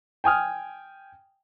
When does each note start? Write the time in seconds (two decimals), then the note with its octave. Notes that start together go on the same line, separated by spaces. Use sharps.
0.24 G5 G#5 D#6 F6